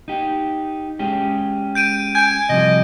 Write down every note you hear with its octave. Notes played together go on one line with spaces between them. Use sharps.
D#4 G4
G#3 C#4 G4
G6 D7 D#7
G#5 G6 D7
C3 F3 G3 D#5